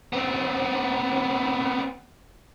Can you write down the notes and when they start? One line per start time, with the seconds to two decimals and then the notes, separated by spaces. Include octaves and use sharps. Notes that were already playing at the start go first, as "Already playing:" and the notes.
0.13 B3 C4